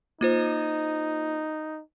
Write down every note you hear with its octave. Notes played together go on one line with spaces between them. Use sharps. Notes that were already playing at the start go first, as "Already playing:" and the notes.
A#3 D#4 F4 C5